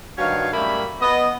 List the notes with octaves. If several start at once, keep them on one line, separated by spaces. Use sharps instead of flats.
G2 D#3 F#4 C#5 F5
F#2 G3 A3 A#3 E5 B5
B3 D#5